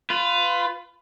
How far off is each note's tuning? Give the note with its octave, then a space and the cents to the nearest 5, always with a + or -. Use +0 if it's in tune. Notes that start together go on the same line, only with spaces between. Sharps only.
F4 +0 B4 +20